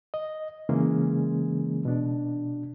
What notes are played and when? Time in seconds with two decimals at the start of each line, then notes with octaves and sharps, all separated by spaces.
0.14 D#5
0.69 C#3 E3 G#3 A#3 C#4 G#4
1.85 B2 D4